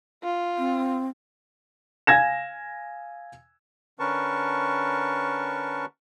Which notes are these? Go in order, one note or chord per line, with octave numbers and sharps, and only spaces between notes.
F4
C4
F5 G#5 G#6 A#6 E7
D3 C#4 A#4 B4 A5 C#6